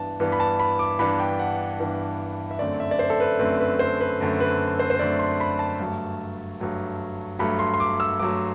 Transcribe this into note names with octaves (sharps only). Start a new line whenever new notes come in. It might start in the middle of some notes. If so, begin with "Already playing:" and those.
Already playing: G2 E3 B3 D4 A5
G2 E3 B3 D4
B5
A5
B5
D6
G2 E3 B3 D4 B5
G5
F#5
G2 E3 B3 D4
E5
F#2 D3 A3 C4 D5
E5
D5
C5
A4
B4
F#2 D3 A3 C4 B4
B4
C5
B4
F#2 D3 A3 C4
B4
C5
C5
F#2 D3 A3 C4 D5
C6
B5
A5
G2 F#3 A3
G2 F#3 A3
G2 F#3 A3 B5
C6
C6
D6
E6
G2 F#3 A3 D6